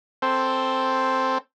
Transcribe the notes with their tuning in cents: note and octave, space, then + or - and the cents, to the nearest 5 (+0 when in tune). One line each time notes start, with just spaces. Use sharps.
C4 +0 A4 +0 C5 +0